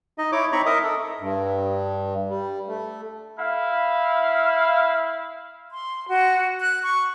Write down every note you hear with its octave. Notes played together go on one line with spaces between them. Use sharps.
D#4 D#5
E4 C#5 D6
C4 D#4 A#5 B5 C#6
A#4 D#5 E5 D#6
A4
G2
G3
A3
E4 F5
C6
F#4
F#6
C#6